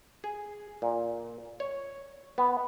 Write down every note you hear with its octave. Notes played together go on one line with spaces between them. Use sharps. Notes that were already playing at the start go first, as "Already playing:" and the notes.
G#4
A#2
C#5
B3